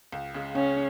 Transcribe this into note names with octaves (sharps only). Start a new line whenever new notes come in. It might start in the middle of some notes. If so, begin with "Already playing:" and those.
C#2
C#3 G#3
C#2 C#4